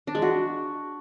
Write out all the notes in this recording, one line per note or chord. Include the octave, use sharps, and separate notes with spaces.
D4
G#3
F#4